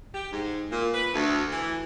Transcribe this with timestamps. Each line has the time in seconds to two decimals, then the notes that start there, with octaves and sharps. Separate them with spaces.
0.12 G4
0.30 G#2
0.69 A#2
0.93 B4
1.12 D2
1.50 E3